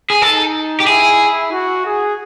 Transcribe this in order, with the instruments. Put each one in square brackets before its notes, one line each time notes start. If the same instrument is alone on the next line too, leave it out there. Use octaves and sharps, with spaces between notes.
[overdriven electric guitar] G#4
[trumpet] D#4 [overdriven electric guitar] A4
[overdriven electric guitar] G4
[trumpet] E4 [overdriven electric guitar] G#4
[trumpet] F#4
G#4